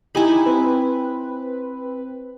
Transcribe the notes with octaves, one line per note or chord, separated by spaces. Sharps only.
D#4 E4 G4 G#5 B5
C4 B4